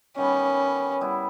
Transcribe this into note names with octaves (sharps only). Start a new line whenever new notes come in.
D#3 G3 B3 C#4
G3 B3 E4